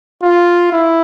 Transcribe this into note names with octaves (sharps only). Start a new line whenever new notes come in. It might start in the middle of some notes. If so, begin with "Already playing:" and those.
F4
E4